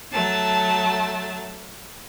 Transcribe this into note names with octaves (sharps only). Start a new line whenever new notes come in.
F#3 A3 A5